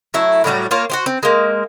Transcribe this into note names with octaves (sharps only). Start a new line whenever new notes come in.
F#3 A3 E4 E5
A2 F#3 G3 F#4
A#3 F4 C#5
F#4 G4 C5
C4
G#3 A#3